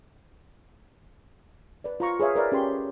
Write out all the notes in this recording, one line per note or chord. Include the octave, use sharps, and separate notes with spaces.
B4 D5
F4 A#5 C#6
G#4 B4 C#5 E5 F5
A#4 B4 D5 E5
C#4 G4 C#5 C6